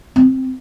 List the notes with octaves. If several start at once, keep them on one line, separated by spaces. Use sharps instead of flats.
C4